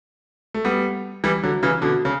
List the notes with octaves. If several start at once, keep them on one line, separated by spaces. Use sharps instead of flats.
A3
G3 B3
E3 G3
D3 F#3
C#3 E3
B2 D3
C#3